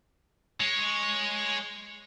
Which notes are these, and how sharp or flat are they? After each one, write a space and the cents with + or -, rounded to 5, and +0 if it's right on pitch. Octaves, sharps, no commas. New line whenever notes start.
G#3 +0 C#5 -5